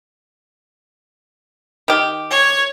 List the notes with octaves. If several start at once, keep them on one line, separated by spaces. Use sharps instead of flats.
D#3 G4
C#5